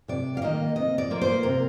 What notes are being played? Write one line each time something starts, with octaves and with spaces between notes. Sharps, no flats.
C3 D5
F5
D#3 A#3 D#5
C3 D#5
D5
F3 A#3 F4
C5
C3 A#4